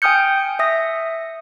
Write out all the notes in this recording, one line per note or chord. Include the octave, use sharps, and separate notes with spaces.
G5 G#5 D#6 F6 G6 C#7
E5 D#6 A#6